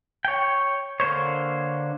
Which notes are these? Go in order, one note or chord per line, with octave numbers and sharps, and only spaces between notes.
C#5 G5
D3 A#3 C5 C#5